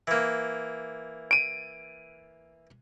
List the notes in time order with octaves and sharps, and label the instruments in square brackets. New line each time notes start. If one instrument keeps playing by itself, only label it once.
[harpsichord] E3 A#3
[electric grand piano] D7 D#7